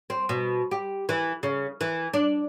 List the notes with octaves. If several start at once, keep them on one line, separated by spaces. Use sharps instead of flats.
C4
B2
G4
E3
C#3
E3
D4